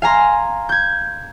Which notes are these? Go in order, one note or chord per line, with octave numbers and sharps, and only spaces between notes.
F5 G#5 A#5 C6
G6 G#6